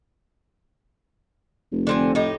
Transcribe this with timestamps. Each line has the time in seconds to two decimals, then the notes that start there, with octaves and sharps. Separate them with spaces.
1.72 F1
1.87 D3 C4 G#5
2.15 A2 D#4 G4